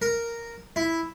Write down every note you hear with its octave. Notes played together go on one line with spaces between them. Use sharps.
A#4
E4